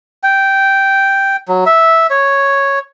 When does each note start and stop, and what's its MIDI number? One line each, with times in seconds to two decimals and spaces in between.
0.23 1.36 79
1.48 1.64 54
1.66 2.07 76
2.10 2.79 73